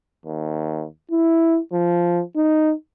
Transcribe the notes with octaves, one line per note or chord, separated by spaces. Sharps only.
D#2
E4
F3
D#4